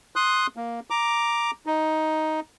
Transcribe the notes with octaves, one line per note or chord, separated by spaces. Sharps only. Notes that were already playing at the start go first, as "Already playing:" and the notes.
C6 D#6 F#6
A#3
A#5 D6
D#4